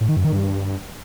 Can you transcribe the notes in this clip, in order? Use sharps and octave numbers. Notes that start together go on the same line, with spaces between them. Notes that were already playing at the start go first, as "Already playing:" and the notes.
A2
D#3
F#2
D#3
G2